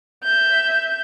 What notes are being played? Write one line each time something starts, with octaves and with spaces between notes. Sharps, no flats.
E5 G6